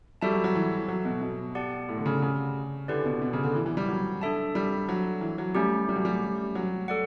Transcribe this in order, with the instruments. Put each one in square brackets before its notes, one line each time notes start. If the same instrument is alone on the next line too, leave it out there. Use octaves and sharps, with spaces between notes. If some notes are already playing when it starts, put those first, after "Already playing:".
[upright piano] G3 [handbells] F#4 A4 E5 A5
[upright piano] F#3
F#3
E3
F#3
B2
B2
[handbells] G4 D5 F#5 A5
[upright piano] A2
D3
C#3
C#3
[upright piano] D3 [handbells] C#4 E4 G4 B4 D5
[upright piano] B2
B2
C#3
D3
E3
E3
G3
F#3
[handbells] D4 A4 E5 A5
[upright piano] G3
F#3
E3
F#3
[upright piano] G3 [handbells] A3 C#4 G4
[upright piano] G3
F#3
G3
F#3
[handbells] A4 D5 F#5